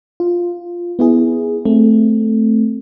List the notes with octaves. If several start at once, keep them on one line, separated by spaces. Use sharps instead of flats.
F4
B3 E4 G#4
A3 C4